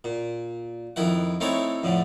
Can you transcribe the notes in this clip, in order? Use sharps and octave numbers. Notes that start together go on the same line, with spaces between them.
A#2
F2 D#3 E4 F#5
A3 C4 D#4 E4 A4 C#5
F2 A2 D3